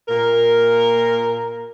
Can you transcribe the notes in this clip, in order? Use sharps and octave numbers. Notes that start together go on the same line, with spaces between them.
A#2 A#4